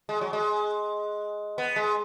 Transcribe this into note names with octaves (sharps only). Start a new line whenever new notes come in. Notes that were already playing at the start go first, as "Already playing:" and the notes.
G#3
F#3
G#3
B3
G#3